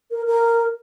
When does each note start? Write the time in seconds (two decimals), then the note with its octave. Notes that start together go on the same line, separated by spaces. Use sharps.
0.11 A#4
0.26 A#4